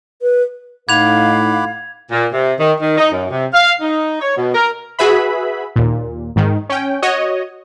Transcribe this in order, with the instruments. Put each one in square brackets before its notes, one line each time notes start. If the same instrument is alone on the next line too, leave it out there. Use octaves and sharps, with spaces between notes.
[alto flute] B4
[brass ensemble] A2 D#4 [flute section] F5 [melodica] F#5 B5 D6 [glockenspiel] G#6 F7
[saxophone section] A#2
C3
D#3
D#3
D#4
F#2
C3
F5
D#4
C#5
B2
A#4
[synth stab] F#4 G#4 B4 E5 B5
D#2 A#2
G#2 D#3
C#4 G5
F#4 C#5 D#5